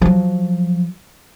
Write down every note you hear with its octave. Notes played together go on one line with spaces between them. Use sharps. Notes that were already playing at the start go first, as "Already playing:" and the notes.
F3 F#3